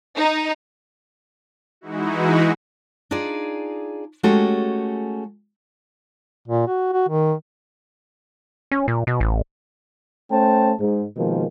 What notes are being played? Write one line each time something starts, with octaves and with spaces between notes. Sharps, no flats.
D#4
E3 G#3 D#4 E4 F#4
D4 D#4 F4 G#4 D5
G#3 A3 C#4 F#4 G4 A4
A#2
F#4
F#4
D#3
C#4
A#2
B2
A1
A3 C#4 C5 G5 A5
G#2
B2 D#3 F3 G#3 A#3